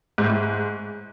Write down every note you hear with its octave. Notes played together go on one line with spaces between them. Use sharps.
G#2
A2
G#2